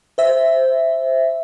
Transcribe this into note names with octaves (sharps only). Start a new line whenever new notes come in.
C5 E5